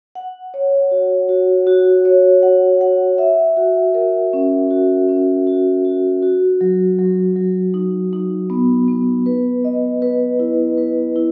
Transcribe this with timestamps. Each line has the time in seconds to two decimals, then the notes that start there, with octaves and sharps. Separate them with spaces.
0.15 F#5
0.54 C#5
0.91 F#4
1.29 F#4
1.67 F#4
2.05 C#5
2.43 F#5
2.81 F#5
3.18 E5
3.57 F#4
3.94 A#4
4.33 C#4
4.71 F#4
5.09 C#4
5.47 F#4
5.85 F#4
6.23 F#4
6.61 F#3
6.99 F#3
7.36 F#3
7.74 D#4
8.13 D#4
8.50 B3
8.88 B3
9.26 B4
9.64 D#5
10.02 B4
10.40 E4
10.78 B4
11.16 E4